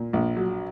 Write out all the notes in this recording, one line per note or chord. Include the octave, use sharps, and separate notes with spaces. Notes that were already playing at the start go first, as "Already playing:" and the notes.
Already playing: A#2
A#1
F#3